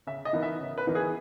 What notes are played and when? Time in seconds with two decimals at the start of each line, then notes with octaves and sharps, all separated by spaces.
0.07 C#3 E5
0.25 D#5
0.33 E3 B3 D#4 A#4
0.43 E5
0.60 C#3
0.78 B4
0.87 E3 B3 D#4 A#4
0.95 G#4